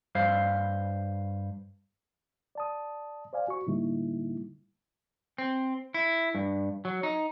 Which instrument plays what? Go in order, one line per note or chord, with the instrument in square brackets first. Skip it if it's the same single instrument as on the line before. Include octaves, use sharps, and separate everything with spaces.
[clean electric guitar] G2 C5 F5
[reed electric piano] D5 A5 D#6
C5 D5 F5 G#5
F#4 C#6
A2 D3 G3 A#3 D#4 E4
[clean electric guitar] C4
E4
G2
F#3
D#4